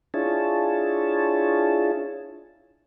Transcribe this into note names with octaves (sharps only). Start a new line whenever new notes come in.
D4 E4 F4 G#4 C#5 A5